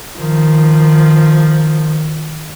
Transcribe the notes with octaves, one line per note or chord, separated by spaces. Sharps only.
D#3 F3